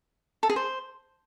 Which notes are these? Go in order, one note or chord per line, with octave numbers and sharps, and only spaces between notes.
A4
G#4
C5